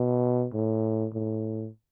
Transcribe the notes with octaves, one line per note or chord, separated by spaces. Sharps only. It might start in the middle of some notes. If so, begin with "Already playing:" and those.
Already playing: B2
A2
A2